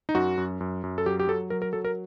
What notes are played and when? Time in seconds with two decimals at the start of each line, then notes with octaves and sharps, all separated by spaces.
0.09 D#4
0.15 F#2 F#4
0.38 F#2
0.61 F#2
0.84 F#2
0.98 A4
1.06 F#3 G4
1.20 G4
1.28 F#3 A4
1.50 F#3 A#4
1.62 A#4
1.73 F#3 A4
1.85 A#4